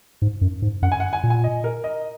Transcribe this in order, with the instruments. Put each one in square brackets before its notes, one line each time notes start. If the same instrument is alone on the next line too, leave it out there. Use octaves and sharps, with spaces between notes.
[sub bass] G#2
F#2
G#2
[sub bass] F#2 [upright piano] F#5
[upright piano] G#5
F#5
G#5
[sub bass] A#2
[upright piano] G#5
D#5
A#4
D#5